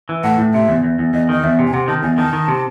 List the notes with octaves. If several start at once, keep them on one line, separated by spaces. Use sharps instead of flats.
E3
A2 F#5
A2
C3 E5
E2
E2
E2
E2 D#5
D#3 D#5
E2 E5
C3
G#5
C3 F#5
D#3 A5
E2 G#5
D#3 A5
D#3
C3